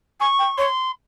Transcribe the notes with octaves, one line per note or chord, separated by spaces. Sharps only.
G#5 C#6
G5
C#5 C6